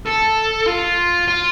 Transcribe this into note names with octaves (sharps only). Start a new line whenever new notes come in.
A4
F4
F4